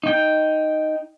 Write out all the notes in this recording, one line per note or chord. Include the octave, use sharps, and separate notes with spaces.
D#4 G5